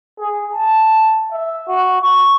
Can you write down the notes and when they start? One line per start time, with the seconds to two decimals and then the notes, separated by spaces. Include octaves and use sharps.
0.19 G#4
0.53 A5
1.32 E5
1.68 F#4
2.01 C#6